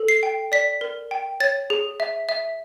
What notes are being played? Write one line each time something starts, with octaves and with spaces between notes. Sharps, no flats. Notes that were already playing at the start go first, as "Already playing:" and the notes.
Already playing: A4
C7
G5
D5 B6
A#4
G5
C#5 A6
G#4
E5
E5